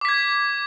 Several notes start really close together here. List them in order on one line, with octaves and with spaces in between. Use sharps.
D6 B6 G#6